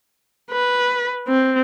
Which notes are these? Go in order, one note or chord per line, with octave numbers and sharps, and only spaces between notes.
B4
C4